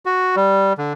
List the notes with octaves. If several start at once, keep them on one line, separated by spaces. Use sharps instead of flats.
F#4
G3
D3